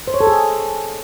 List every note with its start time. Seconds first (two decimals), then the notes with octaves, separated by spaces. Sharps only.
0.07 C5
0.14 C#5
0.20 A4
0.27 G#4